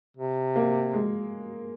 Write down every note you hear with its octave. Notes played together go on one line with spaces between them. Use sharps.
C3
A#3
G#3